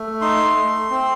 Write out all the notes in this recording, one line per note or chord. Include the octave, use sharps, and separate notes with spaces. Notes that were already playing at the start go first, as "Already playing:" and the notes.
Already playing: A3
D#4 C6
A3
C4